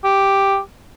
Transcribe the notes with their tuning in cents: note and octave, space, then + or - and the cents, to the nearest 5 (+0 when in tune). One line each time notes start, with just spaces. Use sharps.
G4 +0